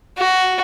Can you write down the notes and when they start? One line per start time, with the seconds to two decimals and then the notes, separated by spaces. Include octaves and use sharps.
0.19 F#4